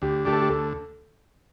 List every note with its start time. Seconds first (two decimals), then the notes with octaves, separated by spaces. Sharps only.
0.02 D2 G4
0.25 D3 A3 D4 G4
0.33 A4
0.41 G4
0.49 D2 A4